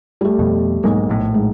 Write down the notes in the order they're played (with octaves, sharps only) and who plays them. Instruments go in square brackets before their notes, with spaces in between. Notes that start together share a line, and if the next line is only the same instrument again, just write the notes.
[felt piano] G3 A3
[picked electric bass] F2 B2
[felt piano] B1 [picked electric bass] G#2 G#3 A#3
[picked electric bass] A#1 A2
[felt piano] G#2